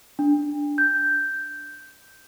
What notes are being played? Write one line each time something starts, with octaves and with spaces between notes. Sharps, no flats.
D4
G6